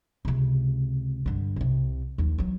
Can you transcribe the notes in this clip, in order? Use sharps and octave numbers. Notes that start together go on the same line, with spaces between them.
C#2 C3
G2 D3
C2 C3
D#2 F3
E3 F#3